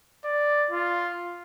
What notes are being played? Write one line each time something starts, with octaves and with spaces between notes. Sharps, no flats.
D5
F4